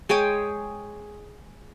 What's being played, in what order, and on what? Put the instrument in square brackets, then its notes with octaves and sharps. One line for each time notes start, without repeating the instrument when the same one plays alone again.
[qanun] G#3 G#4 C#5 G5